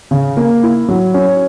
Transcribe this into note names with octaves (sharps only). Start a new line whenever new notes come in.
C#3
A#3
E4
F#3
C#4